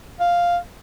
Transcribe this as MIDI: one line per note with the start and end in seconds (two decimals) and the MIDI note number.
0.20 0.58 77